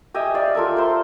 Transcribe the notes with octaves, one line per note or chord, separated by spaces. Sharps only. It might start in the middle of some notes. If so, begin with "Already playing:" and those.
G4 D#5 E5 G#5
D5 F5
F4 A4 A#4 E5
C5 C6